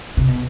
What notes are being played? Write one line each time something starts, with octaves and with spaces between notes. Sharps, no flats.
C3
B2